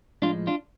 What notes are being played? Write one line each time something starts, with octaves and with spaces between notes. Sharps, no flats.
A2 F3 G#3 D4 F4
D4 F4